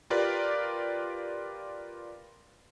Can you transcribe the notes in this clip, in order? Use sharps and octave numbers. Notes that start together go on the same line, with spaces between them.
F4 G4 A#4 B4 D5